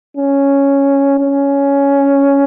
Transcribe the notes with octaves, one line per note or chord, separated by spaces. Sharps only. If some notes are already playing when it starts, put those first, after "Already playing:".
C#4
C#4